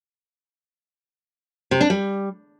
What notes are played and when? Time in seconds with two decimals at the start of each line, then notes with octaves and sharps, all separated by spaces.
1.71 C3
1.81 D4
1.90 G3